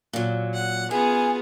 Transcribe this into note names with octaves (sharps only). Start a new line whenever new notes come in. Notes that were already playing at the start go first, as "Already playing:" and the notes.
A#2 F#3
F#5
F#2 B3 F4 G#4 G#5